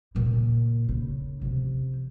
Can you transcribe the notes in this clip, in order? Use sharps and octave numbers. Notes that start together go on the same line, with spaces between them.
A#2 C#3
C#3
C3 F3